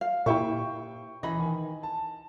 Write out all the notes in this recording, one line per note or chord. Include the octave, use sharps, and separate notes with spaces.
F5
A#2 E4 G4 C5 E5 G5 C#6
E3 D#5 B5
D#3 G#5
A5